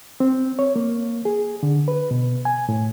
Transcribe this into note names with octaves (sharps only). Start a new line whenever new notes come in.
C4
C#5
A#3
G#4
D3
B4
B2
G#5
A2